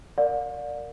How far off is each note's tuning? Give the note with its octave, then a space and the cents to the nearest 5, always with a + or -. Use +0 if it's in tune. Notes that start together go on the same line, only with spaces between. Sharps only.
A#4 -15 D5 +0 F5 +45